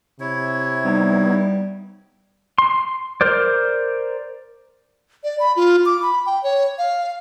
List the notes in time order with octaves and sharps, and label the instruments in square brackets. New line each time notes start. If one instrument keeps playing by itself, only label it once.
[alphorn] C3 [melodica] E4 C#5
[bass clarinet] G3 [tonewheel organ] B3 D#4
[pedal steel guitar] C6
A#4 C5 D5
[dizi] D5
B5
F4
D6
B5
G5
C#5
F5